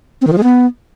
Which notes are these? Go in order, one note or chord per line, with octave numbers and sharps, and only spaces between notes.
C4
D#3
F3
G#3
B3